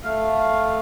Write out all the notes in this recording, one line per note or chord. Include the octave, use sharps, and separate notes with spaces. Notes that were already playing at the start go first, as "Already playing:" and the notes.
A3 F5